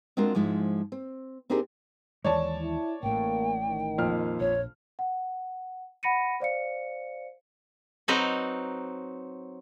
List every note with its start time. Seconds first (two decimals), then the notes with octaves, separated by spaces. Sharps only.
0.17 G#3 C4 D4 F4 F#4 A#4
0.35 G#2 F3 G#3 E4
0.92 C4
1.50 C4 D4 D#4 G4 G#4 A#4
2.25 D#2 E3 G#3 C#5 D5 A5
2.62 E4
3.03 A1 A2 A#3 G5
3.68 D#3
3.98 F2 A#2 F6
4.40 A#1 C#5
4.99 F#5
6.03 F#5 B5 A#6 C#7 D#7
6.40 C5 D5 F5 C#7
8.08 F#3 C4 D#4 B4 A#5